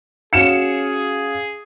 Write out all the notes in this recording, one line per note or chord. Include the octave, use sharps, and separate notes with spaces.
C#4 F#4 G#4 F5 C#7 E7